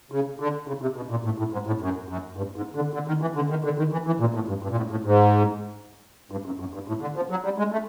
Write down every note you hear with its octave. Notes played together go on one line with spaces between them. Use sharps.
C#3
D3
C#3
C3
B2
A#2
A2
A2
G#2
A2
F#2
F#2
G2
G#2
D3
D3
D#3
E3
D3
D#3
D3
D#3
E3
E3
A#2
A2
G2
G2
A#2
A2
A2
G#2
G2
F#2
F#2
G2
A2
D3
F3
F#3
G3
G#3
A3